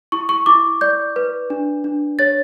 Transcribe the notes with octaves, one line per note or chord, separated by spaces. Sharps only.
E4 C#6
C#6
E4 D6
D5 G6
B4
D4
D4
C#5 A6